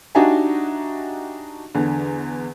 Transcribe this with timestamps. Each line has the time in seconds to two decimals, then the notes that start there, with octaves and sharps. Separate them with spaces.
0.15 D4 D#4 F#4 G4 E5 G#5
1.75 E2 D3